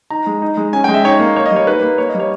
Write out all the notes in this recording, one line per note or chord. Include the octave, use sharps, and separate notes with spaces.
D#4 A#5
G#3
D#4
G#3
C#4 G#5
G5
G#3
E5
D#4 C#5
A#3
A#3 C#5
D#5
G3
C#5
D#4 B4
A#3
A#3 C#5
D#5
G3
C#5